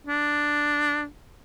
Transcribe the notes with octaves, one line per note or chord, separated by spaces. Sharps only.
D4